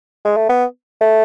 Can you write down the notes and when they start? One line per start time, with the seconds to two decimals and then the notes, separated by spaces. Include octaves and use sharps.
0.25 G#3
0.37 A3
0.49 B3
1.01 A3